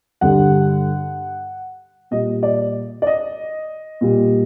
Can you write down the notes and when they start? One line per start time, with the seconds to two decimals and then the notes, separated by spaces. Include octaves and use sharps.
0.21 G2 D3 G3 F#5
2.11 A#2 G3 D#5
2.43 D5
3.02 D5
3.07 D#5
4.01 A#2 G3